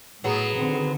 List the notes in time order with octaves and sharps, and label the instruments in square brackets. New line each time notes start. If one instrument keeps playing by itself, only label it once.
[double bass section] A2 [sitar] F#3 B3 [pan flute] G#4
[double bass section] D3 D#3 C4